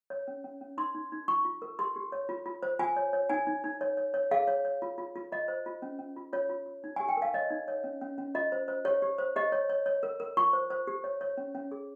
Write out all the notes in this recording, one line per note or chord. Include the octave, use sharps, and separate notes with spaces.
C#5
C#4
C#4
C#4
D#4 C6
D#4
D#4
F4 C#6
F4
A#4
G4 C6
G4
C#5
F4
F4
C5
F4 G#5
C#5
C#5
D#4 G#5
D#4
D#4
C#5
C#5
C#5
G#4 F5
C#5
C#5
F4
F4
F4
F4 D#5
C5
F4
C#4
C#4
F4
F4 C#5
F4
F4
D#4
G4 G#5
G5
A#4 F5
C#5 D#5
D#4
C#5
C#4
C#4
C#4
F4 D#5
C5
C5
G4 C#5
G4
C5
G4 D#5
C#5
C#5
C#5
A#4
A#4
F4 C#6
C5
C5
G4
C#5
C#5
C#4
C#4
G#4